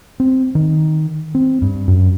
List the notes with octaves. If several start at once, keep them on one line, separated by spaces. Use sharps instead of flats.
C4
D#3
C4
G2
F#2